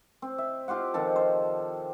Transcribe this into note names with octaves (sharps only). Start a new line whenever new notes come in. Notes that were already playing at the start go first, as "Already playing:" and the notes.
C4
E5
F4 G4 C5 F#5
C3 D#3 F3 A4
C5